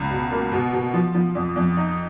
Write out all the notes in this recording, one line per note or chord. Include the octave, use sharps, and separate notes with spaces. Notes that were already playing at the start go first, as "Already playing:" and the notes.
Already playing: C#2
B2
A#3
B2
B2
F3
F3
F2
F2
D#4